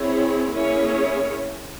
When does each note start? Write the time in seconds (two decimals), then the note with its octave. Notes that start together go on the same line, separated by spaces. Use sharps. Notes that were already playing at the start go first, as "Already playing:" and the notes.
Already playing: C4 E4 G#4 C#5
0.51 A#3 C#4 E4 G#4 C#5